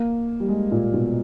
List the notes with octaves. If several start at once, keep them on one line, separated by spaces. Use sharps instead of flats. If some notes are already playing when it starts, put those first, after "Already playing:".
Already playing: A#3
G3
G#3
A#2
B2